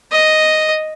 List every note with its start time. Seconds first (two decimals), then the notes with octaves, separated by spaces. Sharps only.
0.12 D#5